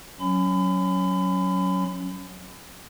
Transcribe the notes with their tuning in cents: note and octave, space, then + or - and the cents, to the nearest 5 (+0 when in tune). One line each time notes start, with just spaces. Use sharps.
F#3 +0 C#4 +0 B5 +40